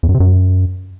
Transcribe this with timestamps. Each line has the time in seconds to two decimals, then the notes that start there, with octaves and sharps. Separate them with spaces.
0.03 E2
0.09 F#2
0.14 C3
0.20 F#2